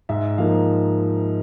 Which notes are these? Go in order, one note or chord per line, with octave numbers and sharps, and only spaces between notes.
G#2 E5
F3 A#3 D#4 F5